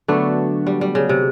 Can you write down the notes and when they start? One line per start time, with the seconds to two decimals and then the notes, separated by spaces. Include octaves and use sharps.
0.08 D3 F#3 A3 B3 D4 F#4
0.67 G3
0.81 G3
0.95 C#3
1.09 C3